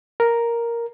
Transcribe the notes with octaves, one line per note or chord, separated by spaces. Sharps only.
A#4